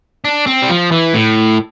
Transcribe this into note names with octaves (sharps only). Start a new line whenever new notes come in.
D4
C4
G3
F3
E3
A2